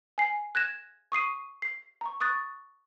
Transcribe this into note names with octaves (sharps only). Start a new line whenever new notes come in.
G#5 C7
F#6 G#6 A#6 E7
C#6 D#6 C7 D#7
C7
A#5 C#6
C#6 D#6 F#6 A6